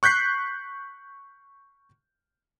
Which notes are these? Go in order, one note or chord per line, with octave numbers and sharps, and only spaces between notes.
C#6 F#6 G6 B6 C7